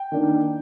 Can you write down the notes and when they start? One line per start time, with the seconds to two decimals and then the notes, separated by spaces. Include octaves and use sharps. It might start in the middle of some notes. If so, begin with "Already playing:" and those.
Already playing: G5
0.12 D#3 A#3 D4